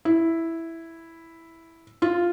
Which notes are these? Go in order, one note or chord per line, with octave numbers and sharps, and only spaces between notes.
E4
F4